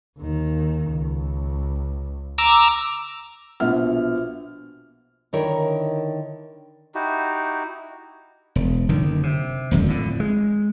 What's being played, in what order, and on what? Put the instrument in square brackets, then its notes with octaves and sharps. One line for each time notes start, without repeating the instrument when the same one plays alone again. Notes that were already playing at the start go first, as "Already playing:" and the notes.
[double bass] D#2 D#3
C#2
[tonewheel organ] A#5 D6 E6
[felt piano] A#1 B2 F3 E5 F#5 F6
[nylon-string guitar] D3 D#3 D#4 E4 A#4 C#5
[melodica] D#4 E4 F#4 G4
[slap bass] E1
F#1 D3 D#3
C3
D#1 G#1 F#2
F2 A2 D3
G#3